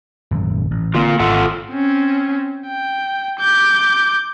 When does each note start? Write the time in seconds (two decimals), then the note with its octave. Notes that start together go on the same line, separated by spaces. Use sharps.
0.31 D#1 G#1 F#2
0.71 A1
0.95 D3 A#3 C4 F4
1.20 G#1 F4 A4 F#5
1.71 C4 C#4
2.67 G5
3.40 D6 G6